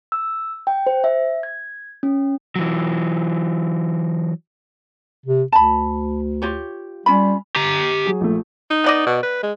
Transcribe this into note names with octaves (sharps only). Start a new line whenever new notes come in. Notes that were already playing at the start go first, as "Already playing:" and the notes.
E6
G5
C5
E5
G#6
C#4
E3 F#3
C3
D2 A5 B5
F4 G4 C#5
G3 C#4 F4 B5
G4 A#5
F#3 G#4
A#1 A3
D#4
B3 D5 D#5
B2
B4
G#3